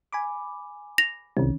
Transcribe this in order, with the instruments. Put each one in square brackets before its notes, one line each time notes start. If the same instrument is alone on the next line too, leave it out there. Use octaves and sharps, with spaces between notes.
[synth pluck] G#5 B5 D6
[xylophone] A#6 F7
[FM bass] C2 [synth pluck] D#3 C#4